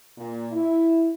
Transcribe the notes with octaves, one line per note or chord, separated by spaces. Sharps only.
A#2
E4